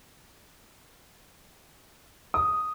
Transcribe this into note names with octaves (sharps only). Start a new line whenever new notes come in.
D#6